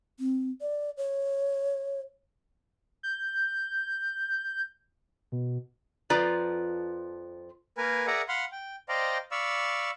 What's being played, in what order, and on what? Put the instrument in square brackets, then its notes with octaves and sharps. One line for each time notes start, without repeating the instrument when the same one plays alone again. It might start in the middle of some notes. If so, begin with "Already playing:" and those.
[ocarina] C4
D5
C#5
[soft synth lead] G6
B2
[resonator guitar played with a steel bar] F2 F3 F4 B4 D5 A#5
[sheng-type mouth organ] A#3 A#4 B4 G#5
G#4 A#4 D5 E5 F#5 A#5
F5 F#5 B5 C6
G5
C5 D5 D#5 F5 G5 A#5
D5 F5 B5 C#6 E6